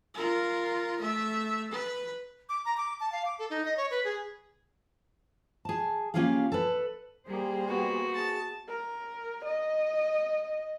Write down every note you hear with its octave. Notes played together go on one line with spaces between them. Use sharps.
F4 A#4
A3 E5
B4
D6
A#5
D6
A5
F5
D6
A4
D#4
D#5
C#5
B4
G#4
G#4 A5
A#3 C#4 F4 G4 G#4 F5
A4 B4
G3 A#3 G#4 C5
B3 F#4
G#4 A5
A#4
D#5